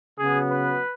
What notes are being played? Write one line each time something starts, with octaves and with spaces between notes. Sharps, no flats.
C#3 F#3 B3 G#4
B4